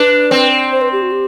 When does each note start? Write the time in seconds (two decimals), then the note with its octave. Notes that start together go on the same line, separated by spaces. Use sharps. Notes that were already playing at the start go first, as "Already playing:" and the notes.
Already playing: D4 B4
0.31 C4
0.72 C5
0.81 B4
0.92 G4
1.02 F#4
1.12 G4